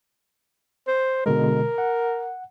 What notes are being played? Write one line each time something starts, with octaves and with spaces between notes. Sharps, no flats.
C5
B2 D3 G#3 A#4
F#5